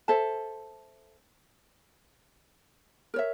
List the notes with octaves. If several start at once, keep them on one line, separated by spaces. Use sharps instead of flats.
A4 C5 E5 A5
A#4 C#5 E5